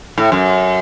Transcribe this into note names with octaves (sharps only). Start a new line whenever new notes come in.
A2
F#2